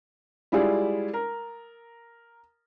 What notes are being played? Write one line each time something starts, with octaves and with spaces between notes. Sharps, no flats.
G3 G#3 E4 F4 G#4 D5
A#4